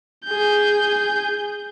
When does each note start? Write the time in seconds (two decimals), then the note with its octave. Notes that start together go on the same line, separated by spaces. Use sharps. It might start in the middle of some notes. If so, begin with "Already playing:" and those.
0.25 G#4 G6